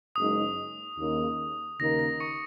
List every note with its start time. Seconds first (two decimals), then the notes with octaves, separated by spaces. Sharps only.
0.16 F#1 F#2 C#3 G#3 D#4 D#6
0.98 D#2 C#3 A#3 D#4
1.80 D#2 C#3 A#3 D#4 A#4 A#6
1.99 A#6
2.20 C#6 C#7